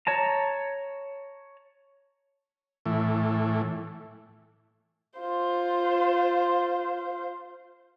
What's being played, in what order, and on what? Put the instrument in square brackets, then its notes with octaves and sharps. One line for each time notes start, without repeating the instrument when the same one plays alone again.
[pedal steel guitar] C#5 A5 A#5
[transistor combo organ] A2 E3
[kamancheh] F4 C5